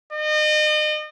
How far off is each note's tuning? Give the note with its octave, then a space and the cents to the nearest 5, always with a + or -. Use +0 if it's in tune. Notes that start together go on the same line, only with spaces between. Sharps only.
D#5 -35